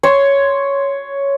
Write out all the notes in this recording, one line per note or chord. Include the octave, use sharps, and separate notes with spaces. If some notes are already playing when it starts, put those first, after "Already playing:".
C#5 C6